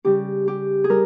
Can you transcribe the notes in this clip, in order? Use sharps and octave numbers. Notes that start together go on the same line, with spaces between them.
C#3 G3 G4
G4
G#4
G3 A#4